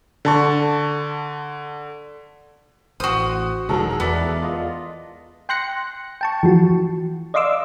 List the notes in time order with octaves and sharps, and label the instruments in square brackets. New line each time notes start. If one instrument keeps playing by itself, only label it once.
[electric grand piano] D3 A5 C#6
[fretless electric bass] A1 [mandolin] F#4 D#6 [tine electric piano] C5
[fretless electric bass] E1 D#3 F#3 [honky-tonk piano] G#3 A4 A#4
[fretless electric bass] E2 [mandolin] B3 [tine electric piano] B4 D5 E5
[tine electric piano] F4 D#5
[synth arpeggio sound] G5 C6 F#6 A#6 C#7
G5 A5 C#6
E3 F3 F#4
D5 D#5 F5 C6 D6 E6